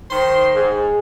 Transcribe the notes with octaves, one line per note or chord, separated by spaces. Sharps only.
D#3 C5 C6
G#2 G#4